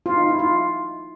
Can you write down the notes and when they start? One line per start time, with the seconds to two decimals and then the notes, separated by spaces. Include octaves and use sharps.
0.06 F4
0.17 D#4
0.29 E4
0.39 F4